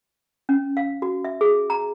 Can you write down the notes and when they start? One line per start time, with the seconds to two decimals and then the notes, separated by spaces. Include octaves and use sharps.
0.49 C#4
0.77 F5
1.02 F#4
1.25 E5
1.41 G#4
1.70 A#5